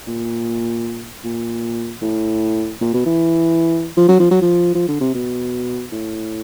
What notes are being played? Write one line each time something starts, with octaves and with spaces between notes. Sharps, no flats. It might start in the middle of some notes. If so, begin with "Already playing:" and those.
A#2
A#2
A2
A#2
B2
E3
F3
F#3
F3
F#3
F3
F3
D3
C3
B2
A2